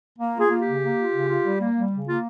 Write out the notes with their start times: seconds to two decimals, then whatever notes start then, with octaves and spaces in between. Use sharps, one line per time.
0.19 A#3
0.35 F4 G#4
0.51 A#3
0.60 G4
0.66 C#3
0.82 A#3
0.98 F4
1.13 C#3
1.29 F4
1.44 G3
1.60 A#3
1.75 G3
1.92 C#3
2.07 A#3 F4